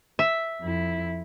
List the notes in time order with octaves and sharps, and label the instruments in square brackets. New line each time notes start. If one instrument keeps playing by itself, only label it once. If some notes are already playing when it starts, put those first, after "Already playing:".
[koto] E5
[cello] F2 E4